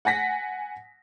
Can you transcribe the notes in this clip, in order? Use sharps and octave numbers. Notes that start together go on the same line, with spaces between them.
F#5 G#5 A#6 B6